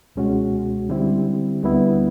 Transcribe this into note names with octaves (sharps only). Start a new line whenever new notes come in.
C#2 B2 G#3 C#4 F#4
D3 G3 C4 E4 G4
D2 D3 G3 B3 E4